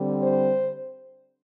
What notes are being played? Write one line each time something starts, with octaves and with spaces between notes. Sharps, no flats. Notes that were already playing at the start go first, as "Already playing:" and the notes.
Already playing: D3 G3 C4
C5